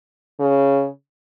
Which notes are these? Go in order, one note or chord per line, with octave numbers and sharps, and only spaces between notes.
C#3